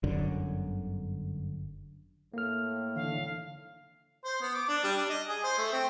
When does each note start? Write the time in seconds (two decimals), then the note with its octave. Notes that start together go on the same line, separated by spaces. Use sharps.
0.04 G1 F#2 D3
2.34 A2 A#3 F6
2.96 D3 E3 F5
4.24 C5
4.41 B3
4.55 D6
4.68 D4
4.83 G3
4.97 D4
5.10 D#5
5.28 G#4
5.43 C5
5.58 A3
5.73 C4